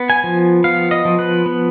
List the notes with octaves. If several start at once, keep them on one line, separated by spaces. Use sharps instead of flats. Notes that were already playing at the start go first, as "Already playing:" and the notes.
Already playing: B3
G#5
F3
B3 F5
D#5
F3
B4
B3